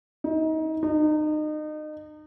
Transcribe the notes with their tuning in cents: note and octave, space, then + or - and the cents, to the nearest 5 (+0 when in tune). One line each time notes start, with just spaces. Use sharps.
D#4 +30
D#4 -30